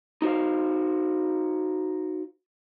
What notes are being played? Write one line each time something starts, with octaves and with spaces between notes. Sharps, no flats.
D#4 F#4 C5 F5